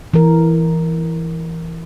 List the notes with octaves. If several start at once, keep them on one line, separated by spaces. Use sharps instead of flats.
E3 A#4